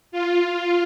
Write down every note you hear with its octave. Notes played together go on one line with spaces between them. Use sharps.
F4